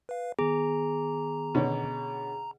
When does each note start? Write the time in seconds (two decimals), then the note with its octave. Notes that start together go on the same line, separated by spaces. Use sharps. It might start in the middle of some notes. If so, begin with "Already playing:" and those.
0.09 B4 F5
0.39 D#3 B3 G#4 A#5
1.55 B2 D3 C#4